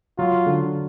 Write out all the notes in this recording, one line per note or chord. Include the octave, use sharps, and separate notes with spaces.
F#3 F4
D3